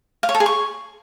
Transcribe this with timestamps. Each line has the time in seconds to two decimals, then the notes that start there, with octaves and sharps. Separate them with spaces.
0.23 F5
0.29 C#5
0.35 A4
0.40 G#4
0.46 C#6